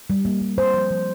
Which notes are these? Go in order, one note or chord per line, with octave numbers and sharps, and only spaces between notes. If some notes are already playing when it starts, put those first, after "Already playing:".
G3
A#3
G3
A#3 C5
F3
F3